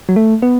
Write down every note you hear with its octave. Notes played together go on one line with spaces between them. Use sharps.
F#3
A3
B3